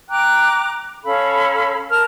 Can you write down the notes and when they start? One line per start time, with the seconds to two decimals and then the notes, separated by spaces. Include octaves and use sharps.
0.10 G5 A#5 D6 F#6
1.04 C#4 A4 F5 B5
1.90 A#4 A5 F6